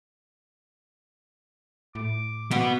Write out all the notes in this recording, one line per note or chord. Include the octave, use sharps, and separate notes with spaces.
A2 D6
B2 B3 F#5